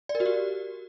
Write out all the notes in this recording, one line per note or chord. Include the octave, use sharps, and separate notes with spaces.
D5
A#4
F#4
G4